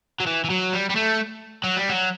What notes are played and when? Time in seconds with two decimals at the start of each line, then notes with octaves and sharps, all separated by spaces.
0.20 F#3
0.27 E3
0.44 E3
0.50 F#3
0.73 G3
0.89 G3
0.95 A3
1.64 F#3
1.77 G3
1.90 F#3